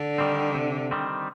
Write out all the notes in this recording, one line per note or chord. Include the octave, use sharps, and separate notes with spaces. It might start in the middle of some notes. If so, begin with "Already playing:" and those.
Already playing: D3
D#3 G3 C4
C3
D#3 G3 C4